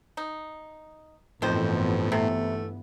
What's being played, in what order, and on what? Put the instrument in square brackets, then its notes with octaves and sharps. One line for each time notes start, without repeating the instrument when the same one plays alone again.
[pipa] D#4
[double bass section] G1 E3 B3 [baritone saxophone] F2 [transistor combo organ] A2 [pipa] D#3 C5
[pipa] C3 [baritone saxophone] A3